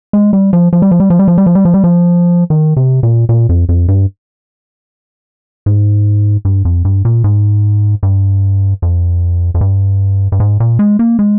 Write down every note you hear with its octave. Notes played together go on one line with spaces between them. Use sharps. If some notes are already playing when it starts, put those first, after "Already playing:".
G#3
G3
F3
F3
G3
F3
G3
F3
G3
F3
G3
F3
G3
F3
G3
F3
D#3
C3
A#2
A#2
F2
F2
G2
G#2
G2
F2
G2
A#2
G#2
G2
F2
F2
G2
G2
G#2
A#2
G#3
A#3
G#3